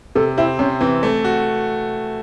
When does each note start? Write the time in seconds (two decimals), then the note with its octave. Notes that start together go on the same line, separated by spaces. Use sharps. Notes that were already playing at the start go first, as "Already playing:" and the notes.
0.15 C3 A4
0.38 C4 E4
0.59 C3 C#4
0.80 E3 C4
1.03 A3
1.24 F#4